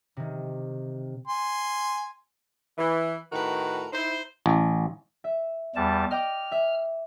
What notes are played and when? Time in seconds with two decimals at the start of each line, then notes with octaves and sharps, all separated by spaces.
0.17 C3 D#3
1.28 G#5 C6
2.78 E3
3.32 A2 D#3 F#4 A#4 B4
3.93 D#4 E4 C5
4.46 A1
5.24 E5
5.76 E2 G3 A5
6.11 D#5 G5 D6 F6
6.52 E5